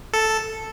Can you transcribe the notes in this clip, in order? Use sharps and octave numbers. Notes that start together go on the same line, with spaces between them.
A4